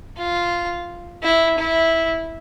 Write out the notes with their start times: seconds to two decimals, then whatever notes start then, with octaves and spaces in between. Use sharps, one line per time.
0.17 F4
1.23 E4
1.58 E4